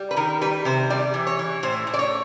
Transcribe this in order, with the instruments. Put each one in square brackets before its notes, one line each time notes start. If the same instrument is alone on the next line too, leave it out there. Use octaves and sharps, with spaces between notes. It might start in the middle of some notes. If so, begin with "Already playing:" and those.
Already playing: [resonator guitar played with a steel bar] G3
B4
D#3 A#4
G3 B4
C3 C5
G3 D5
E3
C#5
E3
A2 C5
A2
D5
C#5